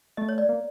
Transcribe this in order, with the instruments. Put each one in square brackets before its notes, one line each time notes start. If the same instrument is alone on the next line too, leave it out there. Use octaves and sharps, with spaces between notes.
[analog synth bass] A3 [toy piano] D#5
[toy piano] C#5
D5
[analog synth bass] A#3